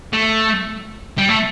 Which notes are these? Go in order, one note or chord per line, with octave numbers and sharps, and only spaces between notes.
A3
G3
A3